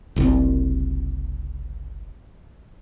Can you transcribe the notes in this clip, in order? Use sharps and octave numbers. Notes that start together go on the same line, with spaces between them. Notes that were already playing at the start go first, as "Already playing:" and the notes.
F#1 C2 F#2 C4